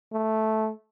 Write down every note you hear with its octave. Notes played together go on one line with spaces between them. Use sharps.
A3